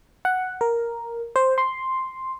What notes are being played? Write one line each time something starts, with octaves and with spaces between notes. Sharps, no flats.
F#5
A#4
C5
C6